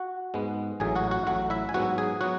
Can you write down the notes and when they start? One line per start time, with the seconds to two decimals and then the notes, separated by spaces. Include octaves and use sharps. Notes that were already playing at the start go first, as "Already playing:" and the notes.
Already playing: F#4 F#5
0.34 G#2 G#3 B3
0.80 A1 A2 F#3 G#4 G#5
0.95 F#4 F#5
1.11 F#4 F#5
1.27 A1 A2 F#3 F#4 F#5
1.50 E4 E5
1.69 G#5
1.74 G#2 F#3 B3 F#4 F#5
1.98 G#4 G#5
2.21 F#3 B3 F#4 F#5